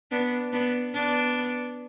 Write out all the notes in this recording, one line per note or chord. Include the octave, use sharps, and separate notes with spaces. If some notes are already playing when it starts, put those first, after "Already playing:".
B3 D4
B3 D4
B3 D4